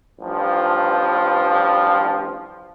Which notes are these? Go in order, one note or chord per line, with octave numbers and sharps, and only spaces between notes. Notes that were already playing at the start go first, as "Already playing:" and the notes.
A1 G2 F3